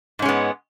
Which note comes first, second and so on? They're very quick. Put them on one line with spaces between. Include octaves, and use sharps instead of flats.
G#2 C#4 G#3 B3